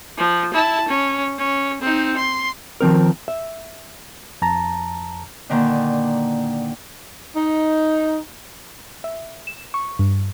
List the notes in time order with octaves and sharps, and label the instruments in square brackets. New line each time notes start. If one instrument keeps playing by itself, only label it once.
[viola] F3
E4 A5
C#4
C#4
C4 D#4
C6
[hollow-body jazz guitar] D#3 F3 C4 A#4
E5
[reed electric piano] F2 A5 A#5
[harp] A#2 D3 D#3 D4
[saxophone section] D#4
[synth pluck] E5
E7
C#6
G2